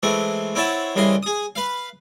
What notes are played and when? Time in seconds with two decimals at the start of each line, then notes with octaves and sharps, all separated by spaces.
0.03 E3 G#3 A3 C4
0.55 C4 E4 C#5 F#5 A5
0.96 C2 C#3 E3 D#5 C6
1.23 G#4 D#6
1.56 B4 F5